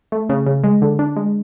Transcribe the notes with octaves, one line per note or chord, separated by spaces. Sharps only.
A3
C#3
C#3
G#3
D3
D4
G#3